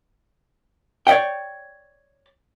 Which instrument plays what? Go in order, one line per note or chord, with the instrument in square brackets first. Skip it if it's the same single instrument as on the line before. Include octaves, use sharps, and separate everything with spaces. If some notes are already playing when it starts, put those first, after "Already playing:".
[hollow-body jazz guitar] C#5 D5 E5 F#5 G5